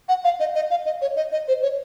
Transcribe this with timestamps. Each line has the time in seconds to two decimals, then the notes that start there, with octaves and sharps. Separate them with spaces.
0.09 F#5
0.24 F5
0.40 D#5
0.55 D#5
0.71 F5
0.86 D#5
1.02 C#5
1.16 D#5
1.32 D#5
1.48 C5
1.62 C#5